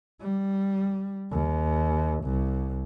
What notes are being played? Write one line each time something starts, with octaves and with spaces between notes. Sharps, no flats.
G3
D#2
C2